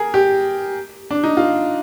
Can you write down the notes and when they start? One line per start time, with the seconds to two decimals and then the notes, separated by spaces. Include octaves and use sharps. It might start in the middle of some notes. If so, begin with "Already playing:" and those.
Already playing: G#4 A#4
0.14 G4
1.11 D4
1.24 D#4
1.37 F4